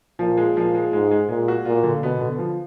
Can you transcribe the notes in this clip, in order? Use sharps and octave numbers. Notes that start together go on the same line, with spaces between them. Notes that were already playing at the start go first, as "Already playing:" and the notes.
A#2 F3
G#3
A#2 F3
G#3
G#2 G#3
G#3
A#2 G#3
F#4
A#2 F4
D3
B2 B3
D3
F3